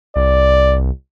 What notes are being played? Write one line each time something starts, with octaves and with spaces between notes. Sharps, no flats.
C2 D5